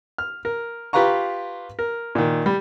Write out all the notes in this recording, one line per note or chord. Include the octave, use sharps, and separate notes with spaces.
F6
A#4
F4 G4 B4 F5 A#5 C#6
A#4
A#2 D#3
G3